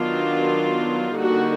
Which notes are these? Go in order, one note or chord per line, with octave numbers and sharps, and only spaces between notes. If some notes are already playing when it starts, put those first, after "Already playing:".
Already playing: D#3 F#3 B3 D4 F4
D3 G3 A#3 D#4 F#4